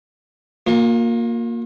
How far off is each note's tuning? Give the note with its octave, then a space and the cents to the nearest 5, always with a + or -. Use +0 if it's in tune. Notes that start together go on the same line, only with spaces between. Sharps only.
A#3 +0 F4 +45